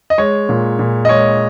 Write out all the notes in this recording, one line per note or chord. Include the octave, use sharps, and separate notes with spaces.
D#5
G#3 C#5
A#2
A#2
D#5
G#3 C#5